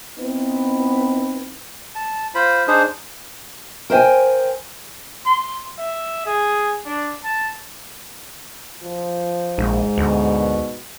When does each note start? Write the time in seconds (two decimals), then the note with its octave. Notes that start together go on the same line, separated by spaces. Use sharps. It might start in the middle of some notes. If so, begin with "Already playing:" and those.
0.19 B3 C4 D#4 E4 B4
1.95 A5
2.35 F4 C5 B5
2.68 D4 D#4 G#4 C5
3.90 A#4 C5 E5 G5 G#5
5.26 C6
5.78 E5
6.26 G#4
6.86 D4
7.24 A5
8.83 F3
9.58 A#1 G#2
9.98 D2 B2